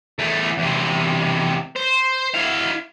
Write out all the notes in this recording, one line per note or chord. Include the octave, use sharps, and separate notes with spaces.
E2 A3
E2 C3
C5
E4 F5